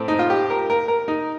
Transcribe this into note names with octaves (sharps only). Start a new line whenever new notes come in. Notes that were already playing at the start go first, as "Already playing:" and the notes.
Already playing: A2 A3 C4
D#4
F4
G4
A#4
A#4
A#4
D#4